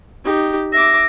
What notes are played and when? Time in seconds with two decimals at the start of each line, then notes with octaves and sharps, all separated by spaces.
0.24 D#4 G4
0.73 E5 D6 A#6